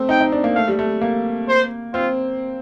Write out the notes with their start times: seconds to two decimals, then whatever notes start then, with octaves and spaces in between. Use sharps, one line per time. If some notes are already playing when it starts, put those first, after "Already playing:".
Already playing: A3 C4
0.09 D#4 G5
0.21 D#4
0.32 D4
0.44 A#3
0.55 A3 F5
0.68 G3
0.79 A3
1.01 A#3
1.48 C5
1.94 C4 F4